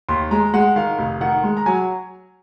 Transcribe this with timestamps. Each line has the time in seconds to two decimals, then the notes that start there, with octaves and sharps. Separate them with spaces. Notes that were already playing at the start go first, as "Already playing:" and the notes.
0.09 D#2 C6
0.31 G#3 A#5
0.54 G#3 F#5
0.76 D#3 F5
0.99 F1
1.21 D#3 F#5
1.43 G#3
1.57 A#5
1.66 F#3 G#5